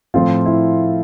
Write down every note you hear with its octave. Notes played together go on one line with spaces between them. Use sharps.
A2 F3 A3 C4 F4
E4